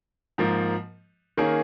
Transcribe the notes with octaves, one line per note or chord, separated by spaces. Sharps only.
G#2 F3 A#3
D#3 A#3 C#4 G#4